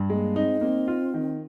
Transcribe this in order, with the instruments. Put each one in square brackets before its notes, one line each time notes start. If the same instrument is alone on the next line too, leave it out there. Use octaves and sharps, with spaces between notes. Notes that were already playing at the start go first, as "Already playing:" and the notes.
Already playing: [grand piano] G2
[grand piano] G#3 [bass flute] A#3
[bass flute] C4 [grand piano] D#4
[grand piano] A#3 [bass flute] C4
[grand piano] F4
D#3